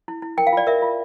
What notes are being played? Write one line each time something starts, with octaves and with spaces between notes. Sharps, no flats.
E4
E4
A#4 G5
F5
F4 D5
A#4 E5
F4